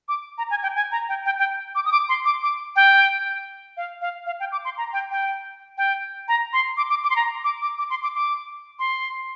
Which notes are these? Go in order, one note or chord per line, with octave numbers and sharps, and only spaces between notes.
D6
A#5
G#5
G5
G#5
A#5
G5
G5
G5
D6
D#6
D6
C6
D6
D6
G5
F5
F5
F5
G5
D6
C6
A#5
G5
G5
G5
A#5
C6
D6
D6
D6
C6
A#5
D6
D6
D6
C6
D6
D6
C6